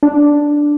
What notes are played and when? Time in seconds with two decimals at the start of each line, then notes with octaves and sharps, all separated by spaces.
0.03 D4